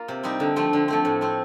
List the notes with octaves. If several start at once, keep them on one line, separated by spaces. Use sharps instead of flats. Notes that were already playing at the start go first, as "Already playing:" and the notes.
Already playing: A#3 F4
C3
G3 C4 D#4
D3
F3 A3 C4
D3
F3 A3 C4
A2
A3 C4